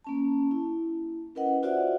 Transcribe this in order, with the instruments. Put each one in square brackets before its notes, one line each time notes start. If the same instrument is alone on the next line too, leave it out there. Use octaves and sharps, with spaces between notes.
[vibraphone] A#3 C#4 A5
E4
C#4 E4 A#4 B4 D#5 F#5
F4 F#4 C5 D5 E5 F#5